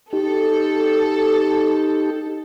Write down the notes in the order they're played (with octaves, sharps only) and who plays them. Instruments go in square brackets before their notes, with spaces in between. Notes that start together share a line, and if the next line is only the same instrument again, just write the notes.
[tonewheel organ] D#4 G4 [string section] A4